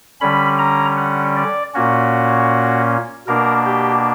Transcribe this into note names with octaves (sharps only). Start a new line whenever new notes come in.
D3 G3 C#4 B5
A#5
F#5
D5
A#2 A#3 C#4 F#4
B2 A#3 D4 A#4
G4